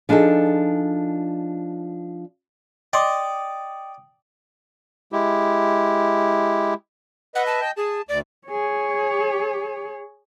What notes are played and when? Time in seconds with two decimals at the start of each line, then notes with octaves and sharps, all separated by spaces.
0.09 F3 D4 D#4 G#4 A4
2.93 D5 D#5 G5 C6 D6 D#6
5.13 G#3 E4 G4
7.35 B4 D#5 E5 F#5
7.47 A5
7.61 D#5 G5 G6
7.77 G#4 A5
8.09 D2 D5
8.48 G#4 C#5